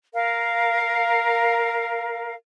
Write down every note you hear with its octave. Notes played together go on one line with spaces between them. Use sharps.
A#4 F5